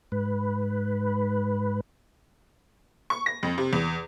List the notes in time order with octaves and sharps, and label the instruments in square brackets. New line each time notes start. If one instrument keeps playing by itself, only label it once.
[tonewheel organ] G#2 B4
[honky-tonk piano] C#6
A#6
F2
C3
E2